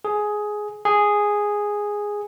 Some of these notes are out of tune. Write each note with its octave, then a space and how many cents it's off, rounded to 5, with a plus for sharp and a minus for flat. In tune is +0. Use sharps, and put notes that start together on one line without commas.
G#4 +10
G#4 -5